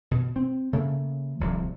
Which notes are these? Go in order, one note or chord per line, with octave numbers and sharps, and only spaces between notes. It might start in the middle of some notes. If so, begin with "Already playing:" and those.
B2
C4
C#3 A3 A#3
D1 C2 F3